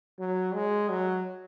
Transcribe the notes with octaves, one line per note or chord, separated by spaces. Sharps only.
F#3
G#3
F#3